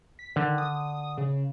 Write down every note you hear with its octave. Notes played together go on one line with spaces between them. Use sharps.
B6
D3 D#3
D#6
C#3